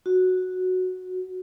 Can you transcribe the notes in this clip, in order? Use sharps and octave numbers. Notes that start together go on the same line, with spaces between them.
F#4